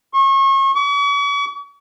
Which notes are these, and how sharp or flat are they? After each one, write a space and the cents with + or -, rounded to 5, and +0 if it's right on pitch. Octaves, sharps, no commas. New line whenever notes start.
C#6 -35
C#6 +45